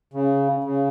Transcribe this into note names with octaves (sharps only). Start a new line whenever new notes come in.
C#3
C#3